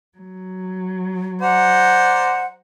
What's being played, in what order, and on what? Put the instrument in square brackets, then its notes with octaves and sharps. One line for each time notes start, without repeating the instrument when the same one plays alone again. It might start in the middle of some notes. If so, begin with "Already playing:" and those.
[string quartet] F#3
[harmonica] C5 D5 A#5 [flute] F#5